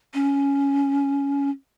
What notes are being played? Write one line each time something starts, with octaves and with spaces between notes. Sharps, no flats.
C#4